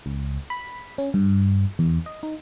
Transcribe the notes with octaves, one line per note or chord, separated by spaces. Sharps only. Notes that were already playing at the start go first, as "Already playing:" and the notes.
C#2
B5
C#4
G2
E2
D#5
D#4